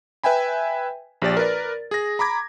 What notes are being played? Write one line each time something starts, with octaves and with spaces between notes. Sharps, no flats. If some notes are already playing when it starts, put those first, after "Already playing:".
B4 E5 G5 G#5 B5
A#1 G4 D5 A6
A#4 B4 D5
G#4 A#6
A#5 B5 D6 G#6